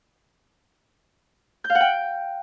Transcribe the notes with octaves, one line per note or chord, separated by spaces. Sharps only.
G6
F5
F#5
G5